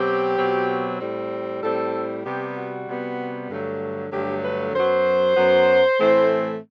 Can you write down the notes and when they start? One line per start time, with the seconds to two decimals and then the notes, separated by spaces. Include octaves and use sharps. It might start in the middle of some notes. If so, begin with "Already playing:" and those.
Already playing: B2 F#3 C4 G4
0.38 B2 F#3 C4
1.00 A2 G3 C4
1.62 A2 G3 C4 A4
2.24 C3 G3 B3 G4
2.55 F#4
2.87 C3 G3 B3
3.49 G2 D3 F#3 A3
4.12 G2 D3 F#3 A3 G4
4.43 B4
4.74 F#2 F#3 B3 C5
5.36 F#2 F#3 B3
5.98 A2 E3 A3 C4